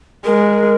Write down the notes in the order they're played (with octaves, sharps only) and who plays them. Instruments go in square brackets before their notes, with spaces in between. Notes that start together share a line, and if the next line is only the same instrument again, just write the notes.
[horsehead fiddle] G#3 [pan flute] A#4